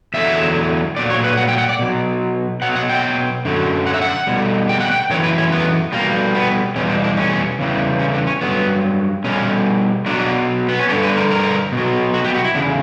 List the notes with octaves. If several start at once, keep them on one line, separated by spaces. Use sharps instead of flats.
E2 D3 F#3 E5
A#2 F#3 D5
C#5
B4
F#5
G5
F#5
D5
B2 F#3
B2 F#3 F#5
F#5
G5
F#2 D3 F#3
F#5
E5
F#5
B2 G3
G5
F#5
G5
F#2 E3 C#5
B4
C#4
B3
B2 G3 A#3
B3
E2 B2 G3 C#4
D4
D4
C#4
E2 C#3 E3 G3
C#4
D4
C#4
G2 F#3 B3
B2 G3 C#4
B2 F#3 D4
B3
C#4
G2 D3 G3 D4
B4
A#4
A#4
B2
F#3
F#4
G4
F#4
E4
E2 C#3 D4